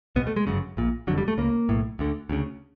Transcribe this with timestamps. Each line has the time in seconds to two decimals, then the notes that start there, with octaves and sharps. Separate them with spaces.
0.16 C2 B2 B3
0.27 A3
0.36 G#3
0.47 G1 F#2 C#3
0.77 A#1 A#2
1.07 F1 F2 D3 F#3
1.18 G3
1.28 A3
1.38 C#2 C#3 A#3
1.69 B1 A2
1.99 D2 D3
2.30 D2 C#3